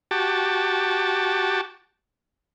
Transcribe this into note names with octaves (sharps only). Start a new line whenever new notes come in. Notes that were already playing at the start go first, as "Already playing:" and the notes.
F#4 G4 A5